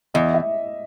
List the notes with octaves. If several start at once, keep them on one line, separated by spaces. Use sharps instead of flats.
E2 D#5
E5